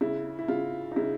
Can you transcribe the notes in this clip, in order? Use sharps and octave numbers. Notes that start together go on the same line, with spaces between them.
C#3 E4
E4
C#3 F4
D#4
C#3 E4